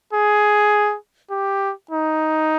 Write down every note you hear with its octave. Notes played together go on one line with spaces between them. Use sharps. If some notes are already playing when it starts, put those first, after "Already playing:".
G#4
G4
D#4